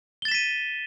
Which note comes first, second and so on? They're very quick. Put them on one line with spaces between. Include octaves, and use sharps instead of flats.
G7 A6 E7 B6 D#7